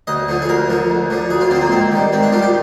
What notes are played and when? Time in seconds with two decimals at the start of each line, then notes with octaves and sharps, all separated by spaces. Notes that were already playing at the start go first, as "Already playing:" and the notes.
0.07 D2 D#5
0.28 D3 F3
0.42 G#4
0.49 D2 A#4
0.70 D3 F3
0.90 D2
1.10 D3 F3
1.30 D2 G#4
1.41 F4
1.51 D3 F3 C4
1.61 A#3
1.71 G#2 C4
1.92 D#3 G3
2.12 G#2 C4
2.23 D4
2.32 D#3 G3 F4
2.43 G4